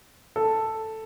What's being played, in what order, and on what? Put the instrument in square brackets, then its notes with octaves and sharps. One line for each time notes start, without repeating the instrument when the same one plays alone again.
[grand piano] A4